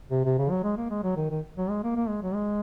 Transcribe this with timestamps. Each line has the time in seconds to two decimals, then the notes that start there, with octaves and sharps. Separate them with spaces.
0.11 C3
0.25 C3
0.38 C#3
0.50 F#3
0.63 G#3
0.77 A#3
0.90 G#3
1.03 F#3
1.17 D#3
1.30 D#3
1.57 F#3
1.70 G#3
1.83 A#3
1.96 A#3
2.08 G#3
2.22 F#3
2.34 G#3